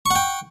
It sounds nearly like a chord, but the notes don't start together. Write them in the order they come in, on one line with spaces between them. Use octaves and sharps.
C#6 F#5 G5